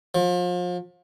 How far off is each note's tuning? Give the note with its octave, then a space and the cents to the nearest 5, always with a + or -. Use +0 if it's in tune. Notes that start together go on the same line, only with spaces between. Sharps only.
F3 +35